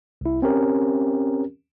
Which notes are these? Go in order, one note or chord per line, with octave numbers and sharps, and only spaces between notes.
C2 E4
C4 C#4 G4 A#4